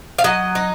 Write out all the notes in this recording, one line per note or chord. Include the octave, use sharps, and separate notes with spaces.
F5
F#3 D#5
D#4